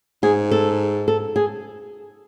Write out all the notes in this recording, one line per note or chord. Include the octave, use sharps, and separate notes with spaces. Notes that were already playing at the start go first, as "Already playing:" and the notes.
G#2 G#4
A4
A4
G#4